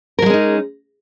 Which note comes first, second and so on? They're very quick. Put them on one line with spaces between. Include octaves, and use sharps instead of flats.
A#4 F#3 G#3 C#4 D#4